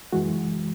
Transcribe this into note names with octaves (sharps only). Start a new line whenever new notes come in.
F#2 E3 G#3 F#4